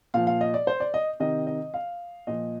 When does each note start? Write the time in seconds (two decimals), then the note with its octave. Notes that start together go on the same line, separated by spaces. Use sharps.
0.14 A#2 F3 F5
0.27 F5
0.41 D#5
0.54 D5
0.67 C5
0.80 D5
0.94 D#5
1.20 C3 D#3 D#5
1.47 D#5
1.74 F5
2.27 A#2 F3 D#5